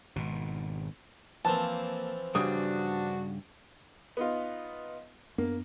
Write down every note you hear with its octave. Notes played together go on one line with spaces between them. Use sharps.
G#1 B2
E3 F3 A#3 C4 A5
G2 C#3 G3 D4 F#4 D#6
B3 D#4 F4
F#2 A#3 B3 D4